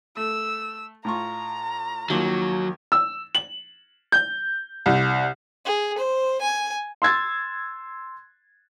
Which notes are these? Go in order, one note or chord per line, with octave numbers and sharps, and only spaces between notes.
A3 E6
A2 F4 A#5 C#6
D#2 D#3 F3 F#3
E6
F#7
G6
C2
G#4
C5
G#5
C6 E6 G#6 A6